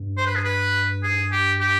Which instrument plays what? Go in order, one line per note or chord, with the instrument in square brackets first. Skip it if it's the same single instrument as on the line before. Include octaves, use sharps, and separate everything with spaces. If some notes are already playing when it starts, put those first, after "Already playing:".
Already playing: [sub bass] G2
[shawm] C5
B4
G#4
B4
G#4
G4
G4